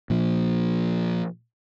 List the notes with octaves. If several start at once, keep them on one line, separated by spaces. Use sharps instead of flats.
A#2 F3